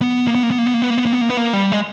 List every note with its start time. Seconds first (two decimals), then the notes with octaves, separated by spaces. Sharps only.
0.02 B3
0.27 A#3
0.35 B3
0.43 A#3
0.51 B3
0.58 A#3
0.66 B3
0.74 A#3
0.82 B3
0.90 A#3
0.98 B3
1.06 A#3
1.13 B3
1.21 A#3
1.29 B3
1.37 A#3
1.53 G3
1.72 G#3